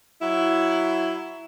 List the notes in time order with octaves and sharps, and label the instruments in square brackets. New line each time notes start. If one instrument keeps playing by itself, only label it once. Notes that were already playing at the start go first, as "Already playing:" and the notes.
[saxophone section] F#3 E4